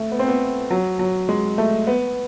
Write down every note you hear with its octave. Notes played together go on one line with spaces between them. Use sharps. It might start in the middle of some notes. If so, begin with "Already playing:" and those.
Already playing: A3
B3
C4
B3
F#3
F#3
G#3
A3
B3